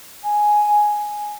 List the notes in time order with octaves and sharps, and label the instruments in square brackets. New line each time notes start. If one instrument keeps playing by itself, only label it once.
[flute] G#5